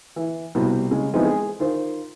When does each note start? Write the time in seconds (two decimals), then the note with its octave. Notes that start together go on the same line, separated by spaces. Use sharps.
0.16 E3
0.55 C2 B2 G3
0.91 C#3 G#3
1.13 E3 F3 G#3 B3 C4 D#4
1.25 G#4
1.60 D#3 F4 C5